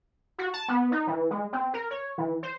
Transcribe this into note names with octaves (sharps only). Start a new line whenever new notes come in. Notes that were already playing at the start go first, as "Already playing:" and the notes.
F#4
A5
B3
D#4
E3
G#3
C4
A#4
C#5
E3
C5